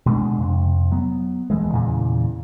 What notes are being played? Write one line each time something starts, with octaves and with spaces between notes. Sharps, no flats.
B2 G#3 C4 D4
F2 C3
F#3 B3
D#1 E3 G#3
E2 A#2 C#3 E3